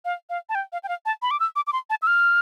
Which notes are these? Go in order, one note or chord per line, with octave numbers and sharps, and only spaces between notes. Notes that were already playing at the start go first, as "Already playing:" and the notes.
F5
F5
A5
G5
F5
G5
F5
A5
B5
D6
E6
D6
D6
C6
A5
E6
F6